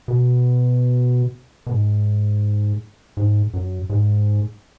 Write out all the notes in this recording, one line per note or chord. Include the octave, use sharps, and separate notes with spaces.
B2
B2
G#2
G#2
F#2
G#2